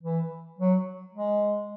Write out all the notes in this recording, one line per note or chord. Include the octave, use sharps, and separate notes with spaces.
E3
F#3
G#3